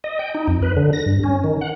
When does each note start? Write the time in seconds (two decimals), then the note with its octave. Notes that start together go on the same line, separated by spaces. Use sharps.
0.04 D#5
0.19 G5
0.35 D#4
0.48 F2
0.63 B4
0.77 D3
0.93 A#6
1.06 G2
1.24 C#4
1.44 D#3
1.61 F#5